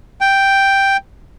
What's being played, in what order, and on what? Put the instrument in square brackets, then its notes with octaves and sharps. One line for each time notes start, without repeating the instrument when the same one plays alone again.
[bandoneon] G5